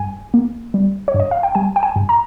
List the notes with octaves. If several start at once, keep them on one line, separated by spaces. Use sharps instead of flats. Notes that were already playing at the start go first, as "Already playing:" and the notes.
Already playing: G2 G#5
A#3
G3
C#5
G2
D#5
F5
G5
G3 G#5
G5
G#5
G2
A#5